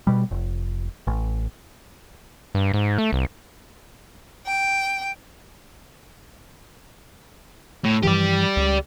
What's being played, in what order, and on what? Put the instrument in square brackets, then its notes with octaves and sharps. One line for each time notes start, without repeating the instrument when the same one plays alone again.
[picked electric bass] B2 G3
F1
A1
[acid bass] G2
G#2
A3
C2
[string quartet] G5
[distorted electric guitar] A2
[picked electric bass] G2 E3 F3 [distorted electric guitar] G4 D5
[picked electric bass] C#2